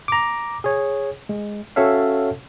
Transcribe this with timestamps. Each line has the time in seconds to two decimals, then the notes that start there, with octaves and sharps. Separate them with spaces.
0.08 A#5 D6
0.64 G#4 C#5
1.29 G#3
1.76 C#4 F#4 A4 C#5 E5 F5